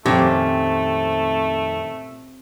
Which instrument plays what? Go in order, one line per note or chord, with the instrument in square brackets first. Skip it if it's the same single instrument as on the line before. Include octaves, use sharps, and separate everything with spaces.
[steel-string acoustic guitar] F2 D#3 [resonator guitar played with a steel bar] A#2 [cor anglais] A3 [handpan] C4 C#4 G4